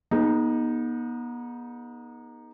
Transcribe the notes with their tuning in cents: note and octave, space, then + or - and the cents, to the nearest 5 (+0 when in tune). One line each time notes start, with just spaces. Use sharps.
B3 -35 D#4 +0 G#4 +0